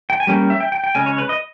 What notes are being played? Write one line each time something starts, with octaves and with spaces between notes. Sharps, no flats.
G5
G#5
G3 A#3 C#4 G5
E5
G5
G5
G5
C#3 G#3 C#4 G#5
C#5
B4
D#5